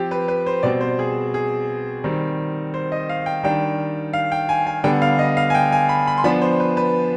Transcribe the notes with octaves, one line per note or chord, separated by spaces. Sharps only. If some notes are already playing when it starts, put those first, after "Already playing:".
Already playing: F3 C4 G4
B4
B4
C5
B2 G3 C4 D5
C5
G#4
G#4
D#3 G3 C4
C5
D#5
F5
G5
D#3 G3 D4 G5
F5
G5
G#5
G#5
D3 G3 B3 G5
F5
D#5
F5
G#5
G5
G#5
B5
B5
C6
F3 B3 D4 B5
C5
B4
B4